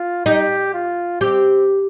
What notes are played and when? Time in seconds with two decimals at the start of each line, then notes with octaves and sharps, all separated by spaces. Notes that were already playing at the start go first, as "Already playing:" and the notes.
Already playing: F4
0.26 D#4 G4
0.74 F4
1.21 C4 G4